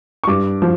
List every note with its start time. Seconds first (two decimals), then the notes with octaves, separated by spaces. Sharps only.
0.24 C#6
0.27 G2 D6
0.62 F3